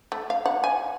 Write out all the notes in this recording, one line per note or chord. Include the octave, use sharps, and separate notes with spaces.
A3
F5
F#5
G#5